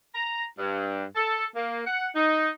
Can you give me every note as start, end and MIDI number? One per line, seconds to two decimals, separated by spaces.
0.14 0.43 82
0.57 1.03 43
1.15 1.44 69
1.54 1.81 58
1.86 2.08 78
2.15 2.49 63